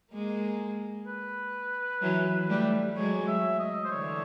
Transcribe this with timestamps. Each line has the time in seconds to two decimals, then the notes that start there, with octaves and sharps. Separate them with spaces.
0.12 G#3 A#3
1.06 B4
2.01 E3 F#3
2.49 G3 A3
2.96 F#3 G#3 C#5
3.27 E5
3.59 D#5
3.85 C5
3.91 D3 E3 C#5